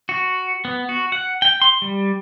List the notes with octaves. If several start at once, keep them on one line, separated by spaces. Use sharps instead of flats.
F#4
B3
F#4
F#5
G5
C6
G3